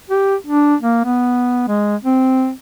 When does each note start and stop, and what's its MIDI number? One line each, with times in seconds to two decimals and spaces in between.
0.10 0.36 67
0.47 0.75 62
0.81 1.00 58
1.05 1.65 59
1.68 1.96 56
2.04 2.51 60